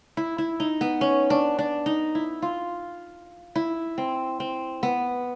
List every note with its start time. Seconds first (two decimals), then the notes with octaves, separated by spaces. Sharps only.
0.17 E4
0.38 E4
0.60 D#4
0.81 B3
1.01 C#4
1.30 D4
1.59 D4
1.86 D#4
2.15 E4
2.42 F4
3.55 E4
3.98 C4
4.40 C4
4.83 B3